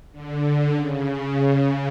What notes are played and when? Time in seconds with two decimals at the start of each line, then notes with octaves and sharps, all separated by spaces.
0.12 D3
0.74 C#3